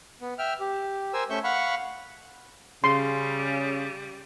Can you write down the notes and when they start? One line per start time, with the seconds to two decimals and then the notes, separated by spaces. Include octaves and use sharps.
0.21 B3
0.38 E5 G5 F6
0.60 G4
1.13 A#4 C5 G#5 E6
1.30 A3 C#4 E5 C#6 G6
1.44 F5 F#5 B5 C#6
2.84 C#3 G3 C6